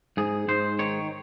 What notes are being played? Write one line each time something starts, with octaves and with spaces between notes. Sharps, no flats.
G#2 G#4
G#2 C5
D#3 C#5